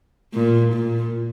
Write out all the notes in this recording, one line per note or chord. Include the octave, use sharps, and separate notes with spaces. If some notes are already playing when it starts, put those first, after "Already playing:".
A#2
A#2